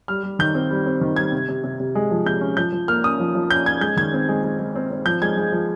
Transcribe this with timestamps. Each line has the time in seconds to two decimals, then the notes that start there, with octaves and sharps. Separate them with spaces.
0.08 G3 F6
0.23 G3
0.39 D#3 G6
0.54 C4
0.71 G3
0.86 C4
1.01 D#3
1.16 G3 G#6
1.32 C3
1.49 C3
1.64 C3
1.80 C3
1.95 G#3
2.11 F3
2.25 C3 G6
2.41 C#4
2.57 F3 G6
2.72 F3
2.88 A#3 F6
3.04 C#4 D#6
3.20 F3
3.35 F3
3.50 C#4 G6
3.66 C#4 G#6
3.81 G#3 G6
3.97 D#3 G#6
4.13 C4
4.29 G#3
4.43 G#3
4.59 G#3
4.75 C4
4.91 C4
5.06 F3 G6
5.22 G#3 G#6
5.37 G#3
5.52 F3